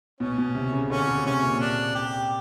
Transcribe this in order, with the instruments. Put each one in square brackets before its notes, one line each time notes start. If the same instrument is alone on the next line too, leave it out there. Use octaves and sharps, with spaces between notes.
[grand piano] B2 [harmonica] C#4
[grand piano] B2
C3
C#3
[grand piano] D3 [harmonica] C#4
[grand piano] C#3
[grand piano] C3 [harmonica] C#4
[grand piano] A#2
[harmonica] D4
G4